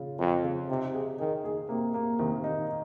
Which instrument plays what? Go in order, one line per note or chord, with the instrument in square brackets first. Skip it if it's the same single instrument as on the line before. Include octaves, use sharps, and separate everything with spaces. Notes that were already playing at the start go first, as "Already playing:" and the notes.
Already playing: [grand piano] C#3 F4
[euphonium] F2 [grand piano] F4
[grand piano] C#3
[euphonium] C3 [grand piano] D#4
[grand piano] G#4
[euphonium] D#3 [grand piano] G#4
[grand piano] G#4
[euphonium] C3 [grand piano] A#3
[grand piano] A#3
[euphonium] C3 [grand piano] D#3
[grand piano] D#4